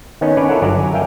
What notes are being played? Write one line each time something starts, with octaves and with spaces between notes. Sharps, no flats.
D#3 B3 C#4 D#4
C#4 D4 B4 C#5 D5
E4 F4 A4 A#4 C#5 F#5
G1 F#3 D5 F#5 A#5
G#5
A#4 E5 F5 G5 G#5